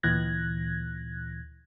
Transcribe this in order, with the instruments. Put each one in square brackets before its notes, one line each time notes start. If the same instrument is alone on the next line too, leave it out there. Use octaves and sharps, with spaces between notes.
[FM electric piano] D2 A#2 E3 F#6 G#6 A#6